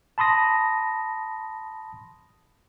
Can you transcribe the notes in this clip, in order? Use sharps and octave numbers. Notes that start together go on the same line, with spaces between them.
A5 B5 C6 D#6 A#6